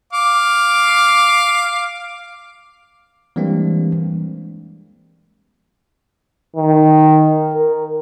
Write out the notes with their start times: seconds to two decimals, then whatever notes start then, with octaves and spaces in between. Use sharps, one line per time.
0.13 F5 D6
3.36 E3 G3 G#3 A#3 C4 D4
6.56 D#3
7.54 A#4